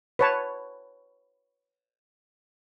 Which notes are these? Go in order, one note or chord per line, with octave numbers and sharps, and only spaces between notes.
B4 C#5 A5